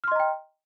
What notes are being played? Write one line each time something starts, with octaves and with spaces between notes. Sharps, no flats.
D#5 G5 A#5 C6 F6